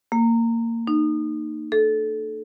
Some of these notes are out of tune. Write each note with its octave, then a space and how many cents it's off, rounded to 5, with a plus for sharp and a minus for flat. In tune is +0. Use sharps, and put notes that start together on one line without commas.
A#3 -20
D#4 -25
A4 -20